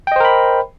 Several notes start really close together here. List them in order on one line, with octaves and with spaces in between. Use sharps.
G5 D#5 C5 A#4 B5